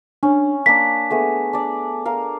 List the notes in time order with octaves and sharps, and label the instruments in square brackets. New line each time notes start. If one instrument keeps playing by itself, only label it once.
[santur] C#4 [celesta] D4
[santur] A#3 D4 [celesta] B6
[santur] A3 B3 G#4
D4 D5
A#4 F5